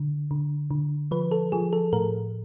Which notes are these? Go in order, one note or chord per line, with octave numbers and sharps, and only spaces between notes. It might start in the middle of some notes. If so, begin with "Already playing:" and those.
Already playing: D3
D3
D3
F3 B4
A4
F3 G#4
A4
A2 A#4